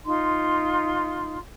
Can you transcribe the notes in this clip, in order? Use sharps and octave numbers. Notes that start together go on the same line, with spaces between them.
D#4 F4 C6